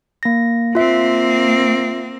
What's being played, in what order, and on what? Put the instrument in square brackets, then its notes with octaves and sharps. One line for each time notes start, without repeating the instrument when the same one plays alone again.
[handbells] A#3 A#6
[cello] A#3 C4 [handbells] F4 E5